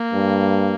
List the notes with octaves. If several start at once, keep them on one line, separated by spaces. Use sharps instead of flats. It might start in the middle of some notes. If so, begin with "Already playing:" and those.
Already playing: A#3
G2